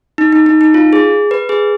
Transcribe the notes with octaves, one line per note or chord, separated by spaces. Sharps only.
D#4
D#4
D#4
D#4
F4
G#4
B4
G#4